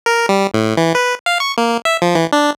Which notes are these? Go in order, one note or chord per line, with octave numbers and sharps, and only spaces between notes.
A#4
G3
A2
E3
B4
F5
C#6
A#3
E5
F3
E3
D4